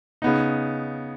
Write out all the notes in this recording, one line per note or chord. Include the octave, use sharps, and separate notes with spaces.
C#3 B3 D#4